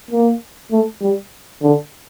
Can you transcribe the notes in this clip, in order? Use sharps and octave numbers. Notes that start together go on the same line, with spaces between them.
A#3
A3
G3
D3